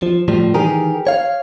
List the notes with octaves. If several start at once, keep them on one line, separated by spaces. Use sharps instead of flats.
F3
A2 F3 G3
D#3 E3 G4 G#4 A#4
C#5 F5